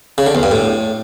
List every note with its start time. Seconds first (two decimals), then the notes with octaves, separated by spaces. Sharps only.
0.18 C#3
0.26 D3
0.35 E2
0.43 G2
0.51 A2